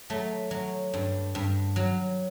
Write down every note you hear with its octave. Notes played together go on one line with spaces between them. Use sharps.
F#3 A3
F#3
G2
G2
F#3